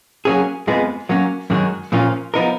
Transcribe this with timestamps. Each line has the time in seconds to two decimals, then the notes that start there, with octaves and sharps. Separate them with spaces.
0.25 F#3 A#3 C#4 G#4
0.67 F2 F3 G#3 B3
1.09 F#3 A#3 C#4
1.50 F#2 D#3 G#3 C#4 F#4
1.92 A#2 F3 A#3 C#4 F4
2.34 F3 B3 D#4 A#4